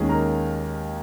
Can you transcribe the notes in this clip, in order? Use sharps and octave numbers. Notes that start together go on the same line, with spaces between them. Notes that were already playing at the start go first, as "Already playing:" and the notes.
Already playing: D#2 D#3 G#3 C#4 G#4 G#5
A#4 A#5